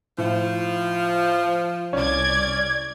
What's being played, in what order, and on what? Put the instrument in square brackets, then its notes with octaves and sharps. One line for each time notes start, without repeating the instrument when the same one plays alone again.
[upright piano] A2 [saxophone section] F3
[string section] C2 D5 G#6 [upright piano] C#4